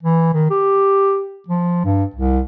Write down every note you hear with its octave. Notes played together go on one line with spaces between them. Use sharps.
E3
D#3
G4
F3
G2
C2